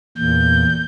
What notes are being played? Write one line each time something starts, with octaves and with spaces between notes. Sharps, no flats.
E2 A#2 G6